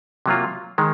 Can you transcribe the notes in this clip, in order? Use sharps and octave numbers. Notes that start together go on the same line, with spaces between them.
C3 F#3 A#3 F4
D#3 G#3